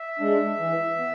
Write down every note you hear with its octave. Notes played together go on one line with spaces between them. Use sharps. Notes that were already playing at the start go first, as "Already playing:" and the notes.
Already playing: E5
G#3 D4
E3
B3